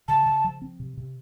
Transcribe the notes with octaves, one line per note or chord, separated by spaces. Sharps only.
C#3 A5
C#3
F3
C4
C3
C3